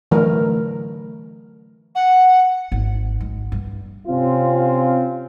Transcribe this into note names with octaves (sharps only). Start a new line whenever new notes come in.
D3 E3 F#3 A3 A#4
F#5
G#1
G#3
G2
C3 C4 C#4 F4